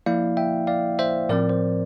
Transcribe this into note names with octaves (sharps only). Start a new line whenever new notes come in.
F3 A#3 E4 D5 F5
E5 G5
D5 F5
C5 E5
A2 F3 C4 A#4 D5
C5